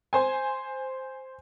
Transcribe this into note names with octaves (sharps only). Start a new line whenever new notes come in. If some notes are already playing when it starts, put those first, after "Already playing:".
C5 G#5